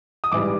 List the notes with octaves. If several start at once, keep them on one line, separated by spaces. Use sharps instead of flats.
D#6
G#2 E3 G3 D6